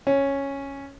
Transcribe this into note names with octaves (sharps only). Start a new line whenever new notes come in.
C#4